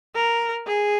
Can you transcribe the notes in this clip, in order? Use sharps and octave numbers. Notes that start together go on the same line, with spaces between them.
A#4
G#4